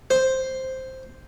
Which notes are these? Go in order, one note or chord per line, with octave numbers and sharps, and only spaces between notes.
C5